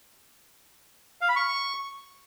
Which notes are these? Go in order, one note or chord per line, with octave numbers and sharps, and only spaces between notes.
F5
B5
C#6